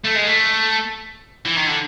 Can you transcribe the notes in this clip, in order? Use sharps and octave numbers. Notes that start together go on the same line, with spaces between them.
A3
G#3
A3
E3
D#3
D3